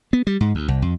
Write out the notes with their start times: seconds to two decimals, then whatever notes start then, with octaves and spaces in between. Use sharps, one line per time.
0.13 B3
0.27 G3
0.41 G#2
0.55 D2
0.68 C2
0.82 F2